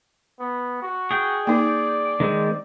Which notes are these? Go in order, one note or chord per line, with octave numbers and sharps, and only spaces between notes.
B3
F#4
G#4 G5
A#3 D#4 D5
D#3 G#3 C4